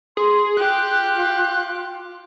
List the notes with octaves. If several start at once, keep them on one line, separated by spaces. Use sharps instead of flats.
G#4 C6
F4 G4 F#6